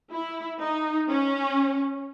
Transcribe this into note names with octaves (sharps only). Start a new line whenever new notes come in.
E4
D#4
C#4